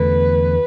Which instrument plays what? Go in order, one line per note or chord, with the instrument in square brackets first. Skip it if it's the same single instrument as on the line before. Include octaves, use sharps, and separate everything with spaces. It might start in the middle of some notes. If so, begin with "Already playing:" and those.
Already playing: [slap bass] E2 D3 A3 [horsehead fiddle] B4